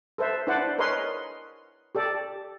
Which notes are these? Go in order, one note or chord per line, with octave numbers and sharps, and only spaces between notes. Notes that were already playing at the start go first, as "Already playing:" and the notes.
A4 B4 C5 E5
D4 E4 B4 C5 D5 F#5
G#4 A#4 B4 C#5 D#5 C6
G4 A4 D5